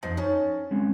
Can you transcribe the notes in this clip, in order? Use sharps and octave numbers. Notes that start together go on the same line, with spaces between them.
F2 D#4 C5 A5
C#4 D#4 A5
G#3 C4 C#4